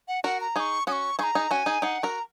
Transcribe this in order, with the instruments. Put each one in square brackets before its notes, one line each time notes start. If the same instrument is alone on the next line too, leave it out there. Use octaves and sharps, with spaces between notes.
[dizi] F#5
[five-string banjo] F#4 A#4 [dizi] F#5
[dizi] A#5
[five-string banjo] D#4 G#4 [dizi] D#6
[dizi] C#6
[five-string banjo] C#4 F#4 [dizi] D#6
[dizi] C#6
[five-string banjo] D#4 G#4 [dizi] C#6
[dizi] A#5
[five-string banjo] D#4 G#4
[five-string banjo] C#4 F#4 [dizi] G#5
[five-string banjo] D#4 G#4
[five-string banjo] D#4 G#4 [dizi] F#5
[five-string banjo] F#4 A#4 [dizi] A#5